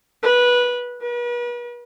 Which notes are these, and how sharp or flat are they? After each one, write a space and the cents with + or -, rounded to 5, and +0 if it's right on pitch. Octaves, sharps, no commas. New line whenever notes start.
B4 -15
B4 -40